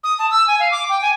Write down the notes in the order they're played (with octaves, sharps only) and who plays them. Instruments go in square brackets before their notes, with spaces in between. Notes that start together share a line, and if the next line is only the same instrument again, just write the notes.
[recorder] D#6
A5
E6
G#5
F5
D6
G5
G#5